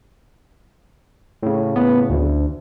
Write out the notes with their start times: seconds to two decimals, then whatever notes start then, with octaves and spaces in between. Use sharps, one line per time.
1.43 A2 C#3
1.76 B3
2.10 D2